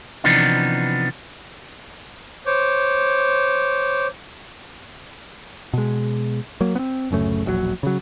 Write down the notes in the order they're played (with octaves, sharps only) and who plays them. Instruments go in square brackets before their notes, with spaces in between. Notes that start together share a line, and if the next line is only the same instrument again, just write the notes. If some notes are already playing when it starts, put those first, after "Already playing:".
[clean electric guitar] C3 E3 F3 B3 D4 D#4
[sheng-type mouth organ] C5 C#5 D6
[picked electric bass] B2 G#3
F#3 A#3
B3 C4
D1 F#2 C#3 A3
E1 A#1 A2 F#3
C#3 F#3